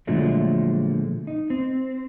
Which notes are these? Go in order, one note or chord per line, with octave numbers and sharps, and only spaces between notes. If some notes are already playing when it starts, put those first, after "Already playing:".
A#2 D3 F3 F#3 G#3 A3
D#4
C4